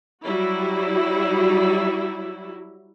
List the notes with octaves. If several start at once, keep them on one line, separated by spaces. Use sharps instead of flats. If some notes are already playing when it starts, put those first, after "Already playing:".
F#3 G3 E4 F#4